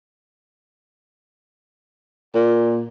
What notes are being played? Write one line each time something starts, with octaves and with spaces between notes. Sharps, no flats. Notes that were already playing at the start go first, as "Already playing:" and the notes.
A#2